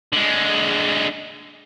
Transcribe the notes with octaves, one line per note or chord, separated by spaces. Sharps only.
D3 G#3